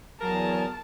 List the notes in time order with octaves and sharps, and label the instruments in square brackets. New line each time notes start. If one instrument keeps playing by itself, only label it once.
[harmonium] E2 [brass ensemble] F#3 G#4 [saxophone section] A#4 [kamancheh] A5